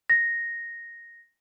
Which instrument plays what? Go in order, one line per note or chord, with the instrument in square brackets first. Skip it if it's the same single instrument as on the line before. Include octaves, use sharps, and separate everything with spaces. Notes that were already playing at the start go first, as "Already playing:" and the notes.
[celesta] A#6